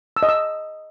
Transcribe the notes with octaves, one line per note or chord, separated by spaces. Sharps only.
E6
D#5
E6